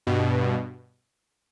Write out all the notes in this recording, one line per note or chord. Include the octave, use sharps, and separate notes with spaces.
G2 B2